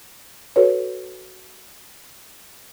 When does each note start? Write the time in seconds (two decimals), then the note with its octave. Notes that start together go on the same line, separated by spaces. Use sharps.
0.56 F#4 A4 B4 C#5